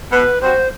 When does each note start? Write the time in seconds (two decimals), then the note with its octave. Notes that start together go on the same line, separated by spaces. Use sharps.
0.11 B2 B4
0.41 G3 C4 F#4 C5